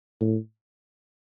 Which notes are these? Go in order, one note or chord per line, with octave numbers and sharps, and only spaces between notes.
A2